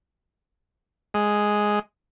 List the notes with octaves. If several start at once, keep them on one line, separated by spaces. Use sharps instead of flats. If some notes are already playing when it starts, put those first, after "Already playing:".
G#3